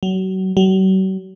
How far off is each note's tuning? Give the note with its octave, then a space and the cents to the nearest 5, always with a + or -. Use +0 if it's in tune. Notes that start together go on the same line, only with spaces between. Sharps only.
F#3 +30
F#3 +45